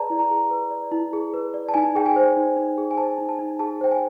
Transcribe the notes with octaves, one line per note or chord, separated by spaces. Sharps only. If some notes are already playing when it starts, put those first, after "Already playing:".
Already playing: G#4 B4 D5 A5 A#5
E4
A#5
G#4
B4
D5
E4
G#4
B4
D5
A5
D#4 G#5
G#4 G5
G#5
C5
D#4
D#4
G#4
G#5
C5 A5
D#4
A5
D#4
G#4 A5
C5 G5
G#5